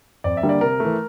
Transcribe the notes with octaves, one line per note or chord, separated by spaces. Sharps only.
F2 D5
E5
D3 G3 A#3
D5
C3 A#4
E3 A3